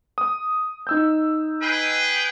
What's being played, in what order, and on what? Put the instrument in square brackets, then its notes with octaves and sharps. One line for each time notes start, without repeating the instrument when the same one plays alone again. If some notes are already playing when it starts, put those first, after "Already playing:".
[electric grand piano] D#6
D#4 E6 G6
[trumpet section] G#4 B4 G5